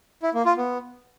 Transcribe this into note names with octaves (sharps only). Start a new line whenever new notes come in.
E4
A#3
F4
B3